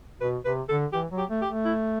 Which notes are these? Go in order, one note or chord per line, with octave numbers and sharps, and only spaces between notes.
B2 B4
C3 B4
D3 A4
E3 G4
F#3
G4
A3
G4
A3
E4